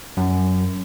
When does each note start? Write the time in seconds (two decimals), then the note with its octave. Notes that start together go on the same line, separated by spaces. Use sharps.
0.17 F#2